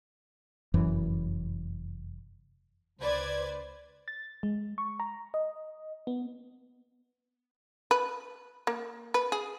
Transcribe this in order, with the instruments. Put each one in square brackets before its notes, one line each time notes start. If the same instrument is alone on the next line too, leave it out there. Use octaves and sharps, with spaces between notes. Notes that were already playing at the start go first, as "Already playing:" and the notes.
[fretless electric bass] F1 F#2 E3
[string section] C#2 B4 C5 D5 G#6
[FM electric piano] A6
G#3
C#6
A#5
D#5
B3
[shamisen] B4
A#3
B4
G#4